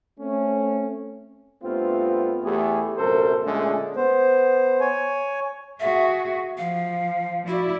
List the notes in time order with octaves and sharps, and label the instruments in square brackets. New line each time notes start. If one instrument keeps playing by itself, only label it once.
[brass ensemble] A3 C4 C#4
[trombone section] G2 A3 B3 C4 F4
E2 A3 G4 G#4
A#1 F#2 C3 A4 A#4 C5
A#2 D3 G#3 A3 C#4 G#4
[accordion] B3 C5
C#5 G#5
[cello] F#4 G#4 [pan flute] E5
[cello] F3 [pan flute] F5
[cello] E4 D5 [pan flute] F#4